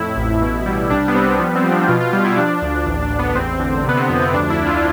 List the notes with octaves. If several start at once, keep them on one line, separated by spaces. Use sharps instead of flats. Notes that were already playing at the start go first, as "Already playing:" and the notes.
Already playing: F2 A2 E4
A1
B2
G3
C2 D4
B3
G3 C4
F3 B3
C4
F3
D4
B2 F4
F4
G3 F4
E4
F3 D4
D2
A1 D4
D4
A1
B3
E2 C4
D3
C3 B3
C4
F2 B3
C4
D2 D4
E4
D2
F4